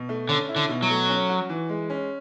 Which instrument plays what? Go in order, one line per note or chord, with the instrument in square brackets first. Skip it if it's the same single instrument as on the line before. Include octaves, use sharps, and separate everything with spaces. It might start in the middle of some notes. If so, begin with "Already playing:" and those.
Already playing: [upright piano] B2
A3
[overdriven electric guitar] D3 [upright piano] C#4
[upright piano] E4
[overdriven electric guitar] D3
[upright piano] B2
[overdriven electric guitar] F#3
[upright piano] A3
C#4
F#4
E3
G#3
C#4